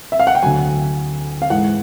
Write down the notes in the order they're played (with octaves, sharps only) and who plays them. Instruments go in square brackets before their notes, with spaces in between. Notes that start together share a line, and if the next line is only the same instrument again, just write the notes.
[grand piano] E5
F5
F#5
G5
D2 D3 F#3 G#5
F5
G#2 E3 G#3 F#5